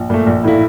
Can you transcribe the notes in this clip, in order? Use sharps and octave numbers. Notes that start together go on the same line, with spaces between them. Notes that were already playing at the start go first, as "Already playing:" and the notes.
Already playing: A#1
A#2 A3
A#1
A2 E3 A#3 E4